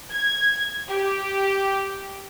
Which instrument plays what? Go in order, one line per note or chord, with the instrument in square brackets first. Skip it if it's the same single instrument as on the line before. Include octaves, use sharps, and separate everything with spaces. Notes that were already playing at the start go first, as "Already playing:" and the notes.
[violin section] G#6
G4